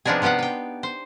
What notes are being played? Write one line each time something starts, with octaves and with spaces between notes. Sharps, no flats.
C3 F3 B3 D4 D#4 G#4
C3 B3 G4 F5 F#5
B4 G5
C5